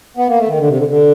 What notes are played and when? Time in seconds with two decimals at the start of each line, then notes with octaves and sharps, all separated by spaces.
0.17 B3
0.28 A#3
0.38 A3
0.48 D#3
0.58 D3
0.67 C3
0.78 D3
0.88 D3